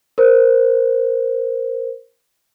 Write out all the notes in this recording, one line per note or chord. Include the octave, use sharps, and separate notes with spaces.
A#4 C5